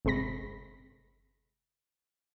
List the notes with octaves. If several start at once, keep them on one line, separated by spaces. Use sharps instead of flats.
G1 C3 G#3 B5 A#6